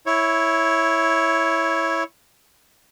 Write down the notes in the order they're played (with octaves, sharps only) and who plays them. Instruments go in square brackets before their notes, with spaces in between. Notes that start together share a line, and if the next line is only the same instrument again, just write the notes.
[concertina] E4 C#5